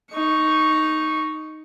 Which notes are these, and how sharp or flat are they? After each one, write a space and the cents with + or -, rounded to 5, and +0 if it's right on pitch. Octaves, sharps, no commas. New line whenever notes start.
D#4 +0 C#6 +0